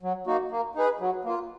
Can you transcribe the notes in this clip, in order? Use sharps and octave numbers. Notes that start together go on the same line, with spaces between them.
F#3
A#3 D#4 F#4
A#3
D#4 G#4 B4
F#3
A#3 F4